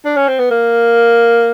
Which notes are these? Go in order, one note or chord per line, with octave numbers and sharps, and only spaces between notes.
D4
C#4
C4
B3
A#3